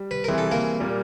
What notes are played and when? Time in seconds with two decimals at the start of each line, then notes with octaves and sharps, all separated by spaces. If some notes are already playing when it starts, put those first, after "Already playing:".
Already playing: G3
0.11 B4
0.24 E3 G3 C4 E4 G#4 A#4
0.38 A4
0.51 A#3 A#4
0.80 A#2 G3 A#3